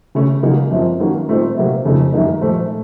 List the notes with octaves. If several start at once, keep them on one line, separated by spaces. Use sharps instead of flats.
C#3 A3 C#4
C#3 F#3 A#3 D#4
F#2 F3 C4
D#3 F#3 A#3 C#4
A#2 A3 C4 D#4
C3 F#3 A#3
F2 C#3 A3 D#4
F#2 D#3 A#3 D#4
A#2 F3 A3